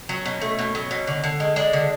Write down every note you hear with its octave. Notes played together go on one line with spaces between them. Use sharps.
F#3 C#4
B2
A3
B2
F#3
B2
D3
D3
G#3
G#3 D4
D3